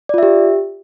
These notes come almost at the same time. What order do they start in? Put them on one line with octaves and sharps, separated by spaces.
D5 F4 E5 G4